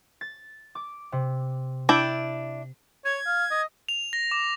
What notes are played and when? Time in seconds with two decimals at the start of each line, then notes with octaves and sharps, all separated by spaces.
0.21 A6
0.75 D6
1.12 C3
1.89 D4 E4 G5
3.05 C#5 G#6
3.27 F5
3.51 D#5
3.89 F7
4.13 A#6
4.31 D6